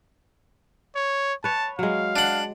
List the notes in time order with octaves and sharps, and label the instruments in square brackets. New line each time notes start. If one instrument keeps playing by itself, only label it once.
[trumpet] C#5
[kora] B4 C#5 [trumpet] A5
[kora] F#3 G#3 [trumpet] F5
[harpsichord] D4 F#5